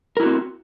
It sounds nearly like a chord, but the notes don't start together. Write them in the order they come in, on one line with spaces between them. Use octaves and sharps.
A#4 E4 F#4 C4